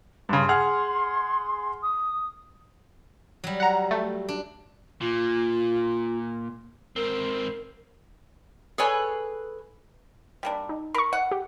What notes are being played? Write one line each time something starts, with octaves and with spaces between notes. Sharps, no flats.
G2 C#3 C6
G#4 F#5 F6
D#6
F#3 G3
F#5 A#5
A3
D4
A#2 F4
G#2 C4 A#4
G#4 A4 B4 C#5 G#5
G3 A#3 D4
D#4
A#4 B5 C#6
F#5
G4